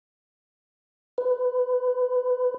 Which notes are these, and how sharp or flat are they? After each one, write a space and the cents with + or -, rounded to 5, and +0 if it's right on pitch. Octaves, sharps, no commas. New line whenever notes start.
B4 +25